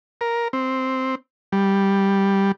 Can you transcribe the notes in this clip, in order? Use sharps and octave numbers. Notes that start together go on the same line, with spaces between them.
A#4
C4
G3